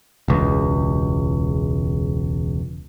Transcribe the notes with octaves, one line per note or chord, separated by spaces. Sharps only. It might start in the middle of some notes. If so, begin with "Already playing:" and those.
E1 C#2